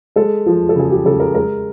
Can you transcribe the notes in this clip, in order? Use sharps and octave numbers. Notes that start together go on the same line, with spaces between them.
G#3 A4
F3
A4
C#3 G#4
G4
C#3 A4
A#4
G#3 A#4